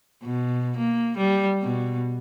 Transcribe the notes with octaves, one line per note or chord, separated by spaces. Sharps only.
B2
A#3
G3
B2